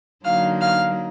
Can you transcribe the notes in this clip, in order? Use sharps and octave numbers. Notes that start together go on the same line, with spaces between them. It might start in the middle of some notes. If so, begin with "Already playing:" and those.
D3 F#3 A#3 D#4 F5 F6
F5 F6